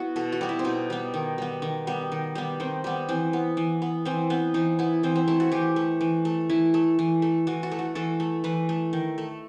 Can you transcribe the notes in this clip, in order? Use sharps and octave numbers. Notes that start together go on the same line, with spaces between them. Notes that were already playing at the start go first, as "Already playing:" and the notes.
Already playing: B3 E4 F#4
B2 A4
F#4
G3 B3
E4
C4
B2 D#4
G3 B3
D#3
G3 B3
D#3
G3 B3
D#3
G3 B3
D#3 C4
G3 B3
E3 C4
B3
E3
B3
E3 C4
B3 C4
E3 D#4
B3 E4
E3 C4
C4
A3 E4
F#4
E3 G4
A3
E3
A3
E3 E4
A3
E3
A3
E3 F#4
F#4
A3
F#4
E3 A4
A3
E3 B4
A3
D#3
A3